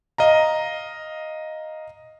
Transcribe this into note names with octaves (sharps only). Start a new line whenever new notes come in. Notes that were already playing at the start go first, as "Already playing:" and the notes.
D#5 F5 A#5